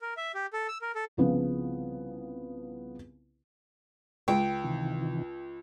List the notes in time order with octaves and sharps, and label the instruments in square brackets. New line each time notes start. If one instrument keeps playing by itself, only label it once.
[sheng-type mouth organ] A#4
E5
G4
A4
E6
A#4
A4
[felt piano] C2 C#3 F3 B3
[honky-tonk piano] C#2 [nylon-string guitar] G5
[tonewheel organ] C3 D#3 E3